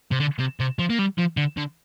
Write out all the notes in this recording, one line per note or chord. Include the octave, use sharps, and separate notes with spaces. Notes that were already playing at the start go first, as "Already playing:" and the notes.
C3
D3
C3
C3
F3
A#3
G3
F3
D3
D3